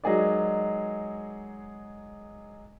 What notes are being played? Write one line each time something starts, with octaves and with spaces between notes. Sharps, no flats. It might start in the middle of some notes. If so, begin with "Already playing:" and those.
F#3 G#3 D#4 G#4 A#4 D5